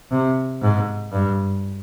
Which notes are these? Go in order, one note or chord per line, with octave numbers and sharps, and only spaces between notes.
C3
G#2
G2